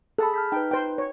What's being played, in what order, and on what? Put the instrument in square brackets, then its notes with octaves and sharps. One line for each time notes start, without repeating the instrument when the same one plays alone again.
[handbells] G#4 A5 B5 [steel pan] A4
[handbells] F6 G6 B6
[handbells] D#4 B4 [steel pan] G5
[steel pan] C5 G5
C#5